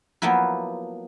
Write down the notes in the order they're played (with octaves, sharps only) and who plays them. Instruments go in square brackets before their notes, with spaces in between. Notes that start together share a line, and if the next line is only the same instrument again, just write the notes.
[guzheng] F3 F#3 A#3 B3 E4